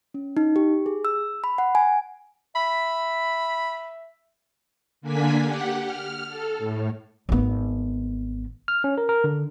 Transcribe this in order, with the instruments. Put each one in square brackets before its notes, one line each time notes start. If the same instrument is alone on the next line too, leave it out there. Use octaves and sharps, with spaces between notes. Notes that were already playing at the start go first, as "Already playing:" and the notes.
[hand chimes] C#4
D#4
G4
G#4
E6
B5
F#5
G#5
[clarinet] E5 [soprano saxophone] B5
[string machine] D3 A#3 D4 G#5 B6
G4 F#5
F6
A4
A2
[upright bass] G#1 B3
[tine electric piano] F6
C#4
A#4
A#4
D3